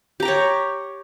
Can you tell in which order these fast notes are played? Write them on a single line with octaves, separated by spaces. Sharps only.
G4 A#5 G5 C#5